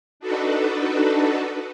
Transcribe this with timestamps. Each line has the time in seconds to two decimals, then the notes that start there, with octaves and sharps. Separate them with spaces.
0.20 D4 D#4 F#4 A4 B4